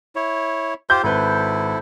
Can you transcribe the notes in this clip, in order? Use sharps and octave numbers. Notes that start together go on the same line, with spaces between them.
E4 C#5
F4 G4 C5 G6
G#1 E4 A4 B4